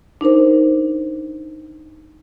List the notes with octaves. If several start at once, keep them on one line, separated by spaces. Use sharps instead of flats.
D4 D#4 A#4 C5